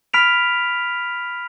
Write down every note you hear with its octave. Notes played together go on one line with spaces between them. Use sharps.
B5 F6 B6 D7 F7